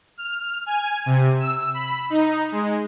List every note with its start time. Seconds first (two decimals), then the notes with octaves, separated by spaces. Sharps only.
0.17 F6
0.66 G#5
1.06 C3
1.40 E6
1.74 B5
2.10 D#4
2.52 G#3